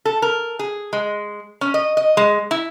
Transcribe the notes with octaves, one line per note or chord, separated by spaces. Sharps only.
A4
A#4
G#4
G#3
C#4
D#5
D#5
G#3
E4